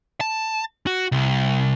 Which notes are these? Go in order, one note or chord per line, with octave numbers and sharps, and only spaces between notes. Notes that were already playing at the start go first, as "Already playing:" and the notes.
A5
F#4
C2